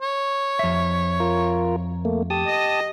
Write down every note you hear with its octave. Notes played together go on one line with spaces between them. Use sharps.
C#5
F2 E5
F4 A#4
A3 A#3
G4 A5 D#6
D#5